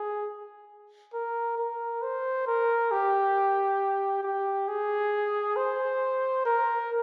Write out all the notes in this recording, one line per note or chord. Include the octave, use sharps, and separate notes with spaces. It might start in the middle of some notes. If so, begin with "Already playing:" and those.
Already playing: G#4
A#4
A#4
C5
A#4
G4
G4
G#4
C5
A#4